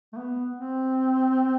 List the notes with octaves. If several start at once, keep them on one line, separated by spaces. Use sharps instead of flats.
A3
B3
C4